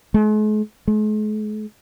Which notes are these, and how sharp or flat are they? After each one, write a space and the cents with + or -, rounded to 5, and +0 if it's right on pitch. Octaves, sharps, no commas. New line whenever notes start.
G#3 +45
G#3 +45